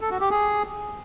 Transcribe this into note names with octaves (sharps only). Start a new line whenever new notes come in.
A4
F#4
G4
G#4